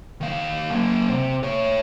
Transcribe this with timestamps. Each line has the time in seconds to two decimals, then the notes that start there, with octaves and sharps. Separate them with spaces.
0.21 D#3 F5
0.70 F#3 A#3
1.09 C3
1.43 A4 C#5